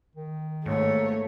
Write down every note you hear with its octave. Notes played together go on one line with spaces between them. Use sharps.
D#3
G#2 A3 A#3 C#5